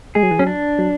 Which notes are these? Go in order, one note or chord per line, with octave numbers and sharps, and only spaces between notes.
G#3 G#4
F#3
E3
F#3 C#4
D4
F#3